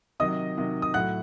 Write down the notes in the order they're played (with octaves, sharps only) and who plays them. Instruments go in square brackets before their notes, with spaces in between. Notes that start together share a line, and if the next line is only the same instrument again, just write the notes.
[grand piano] C3 D#3 F#3 D#5 D#6
C3 D#3 F#3
D#6
A2 F#3 F#5 F#6